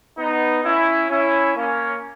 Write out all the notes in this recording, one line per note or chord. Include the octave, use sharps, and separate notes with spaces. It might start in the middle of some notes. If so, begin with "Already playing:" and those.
B3 D#4
C#4 E4
C#4 E4
A#3 C#4